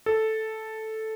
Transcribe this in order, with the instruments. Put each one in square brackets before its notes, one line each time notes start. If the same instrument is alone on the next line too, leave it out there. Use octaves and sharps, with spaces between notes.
[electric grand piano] A4